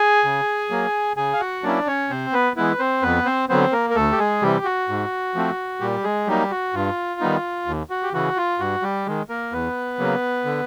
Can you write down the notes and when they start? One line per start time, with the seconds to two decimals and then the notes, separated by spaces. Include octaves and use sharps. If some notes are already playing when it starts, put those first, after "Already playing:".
Already playing: G#4 G#5
0.25 C#3
0.70 F#3 A#3
1.17 C#3 G#4 G#5
1.33 F5
1.40 F#4 F#5
1.63 F#3 A#3 C#4 D4 E4 D5
1.87 C#4 C#5
2.10 C3 C4 C5
2.33 B3 B4
2.56 E3 G#3 B3 E4 B4
2.79 C4 C5
3.02 F2 B3 B4
3.25 C4 C5
3.49 D3 F#3 B3 C4 C5
3.72 A#3 A#4
3.90 A#4
3.95 D2 A3 A4
4.12 G4
4.18 G#3 G#4
4.42 C3 E3 G3 G4
4.65 F#4
4.89 G#2
5.35 F3 A3 C4
5.81 A#2 G3 G4
6.04 G#3 G#4
6.27 F#3 G3 A#3 D#4 G4
6.51 F#4
6.74 G2 F4
7.21 D#3 G3 B3 D#4
7.67 D#2
7.90 F#4
8.03 G4
8.13 C#3 E3 F#4
8.37 F4
8.59 G2 F#4
8.82 G3 G4
9.06 D#3 G#3
9.29 A#3 A#4
9.52 E2 B3 B4
9.99 C#3 F#3 A#3
10.45 D3